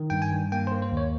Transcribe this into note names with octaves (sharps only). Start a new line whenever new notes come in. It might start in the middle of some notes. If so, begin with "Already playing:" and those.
Already playing: D#3
G2 G5
G#5
G2
A#3 G5
C5
A#3
C5
D#2
C#5